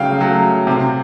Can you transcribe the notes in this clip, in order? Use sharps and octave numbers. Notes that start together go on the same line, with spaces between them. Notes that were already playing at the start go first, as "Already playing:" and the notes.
Already playing: C#3 F#3 A3 F5 G5
F#3 A3
C3